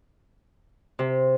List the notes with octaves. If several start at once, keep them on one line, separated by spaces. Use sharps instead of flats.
C3